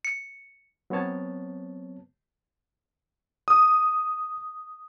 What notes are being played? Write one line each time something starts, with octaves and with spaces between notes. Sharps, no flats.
C#7
F#3 B3 C4 C#5 A5
D#6